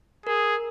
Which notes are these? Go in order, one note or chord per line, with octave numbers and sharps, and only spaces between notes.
G#4 A#4